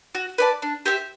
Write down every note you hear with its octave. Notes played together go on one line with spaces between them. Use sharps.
F#4
B4 D5 A5
D4
G4 C5 E5